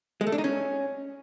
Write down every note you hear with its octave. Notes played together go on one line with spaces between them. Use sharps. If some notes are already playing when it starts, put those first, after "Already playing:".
G#3
A3
D4
D#4
C#4